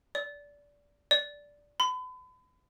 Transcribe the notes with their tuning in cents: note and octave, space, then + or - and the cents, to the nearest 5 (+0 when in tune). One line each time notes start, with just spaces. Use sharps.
D5 -20
D5 -10
B5 +40